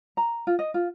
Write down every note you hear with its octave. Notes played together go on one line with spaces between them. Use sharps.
A#5
F4
D#5
F4